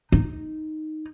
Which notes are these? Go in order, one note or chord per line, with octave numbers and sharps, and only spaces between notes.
D#4